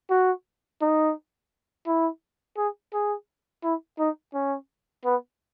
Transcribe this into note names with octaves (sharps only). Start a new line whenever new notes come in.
F#4
D#4
E4
G#4
G#4
E4
D#4
C#4
B3